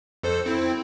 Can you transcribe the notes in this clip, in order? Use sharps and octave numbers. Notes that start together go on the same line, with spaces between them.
F2 A4 C5
C4 E4